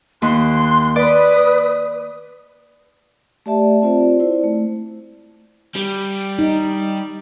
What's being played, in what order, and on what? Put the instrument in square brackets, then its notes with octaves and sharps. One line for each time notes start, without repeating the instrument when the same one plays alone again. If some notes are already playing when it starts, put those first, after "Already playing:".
[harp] D#2 [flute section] C6 F#6
[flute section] B4 D#6 [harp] D5
[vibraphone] A3 G4 D5 E5 A5
C4 F4 C5 D5
E4 C5 D5
A3
[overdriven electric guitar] G3
[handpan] D#4